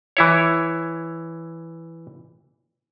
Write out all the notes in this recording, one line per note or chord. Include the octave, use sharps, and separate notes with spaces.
E3 E4 C#5